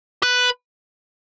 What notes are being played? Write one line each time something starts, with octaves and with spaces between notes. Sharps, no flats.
B4